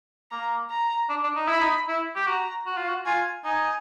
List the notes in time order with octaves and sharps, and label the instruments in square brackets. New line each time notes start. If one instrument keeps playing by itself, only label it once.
[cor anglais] A#3 [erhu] A#5
[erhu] A#5
[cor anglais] D4
D4
D#4
[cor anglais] E4 [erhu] B5
[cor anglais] D#4
E4
G4
[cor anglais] F#4 [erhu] A#5
[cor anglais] F#4
F4
F#4
[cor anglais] F4 [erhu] G#5
[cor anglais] D#4 [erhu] G#5